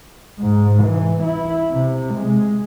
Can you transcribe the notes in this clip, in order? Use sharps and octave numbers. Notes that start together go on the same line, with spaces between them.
G#2
E3
E4
C3
G#3